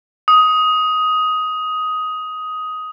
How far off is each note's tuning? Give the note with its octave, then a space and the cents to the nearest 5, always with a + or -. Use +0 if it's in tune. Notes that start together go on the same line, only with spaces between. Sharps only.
D#6 +10